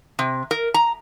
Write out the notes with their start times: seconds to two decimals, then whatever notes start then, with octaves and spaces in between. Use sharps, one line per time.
0.19 C3
0.51 A#4
0.74 A#5